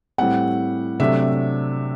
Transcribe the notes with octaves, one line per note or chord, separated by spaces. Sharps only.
A2 G3 C4 F#5
C3 F#3 A3 D4 E5